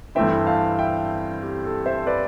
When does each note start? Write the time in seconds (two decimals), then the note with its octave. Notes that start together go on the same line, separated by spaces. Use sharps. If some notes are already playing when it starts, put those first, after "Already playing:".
0.15 G2 E3 A3 C4 E4 E5 G5
0.47 F5 A5
0.79 E5 G5
1.43 G4
1.64 A4
1.86 C5 E5
2.06 B4 D5